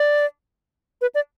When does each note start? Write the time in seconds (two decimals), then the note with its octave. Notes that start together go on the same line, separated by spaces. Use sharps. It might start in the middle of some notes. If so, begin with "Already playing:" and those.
Already playing: D5
1.01 B4
1.15 D5